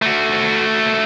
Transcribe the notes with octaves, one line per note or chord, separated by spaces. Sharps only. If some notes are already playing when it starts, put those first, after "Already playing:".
A3 F#4